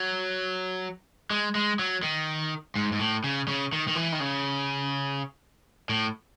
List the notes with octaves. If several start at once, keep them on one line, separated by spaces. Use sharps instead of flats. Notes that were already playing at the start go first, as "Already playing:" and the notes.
Already playing: F#3
G#3
G#3
F#3
D#3
G#2
G#2
A2
C#3
C#3
D#3
D#3
E3
D#3
C#3
A2